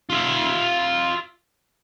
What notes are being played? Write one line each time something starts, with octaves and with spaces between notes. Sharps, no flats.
F4 E5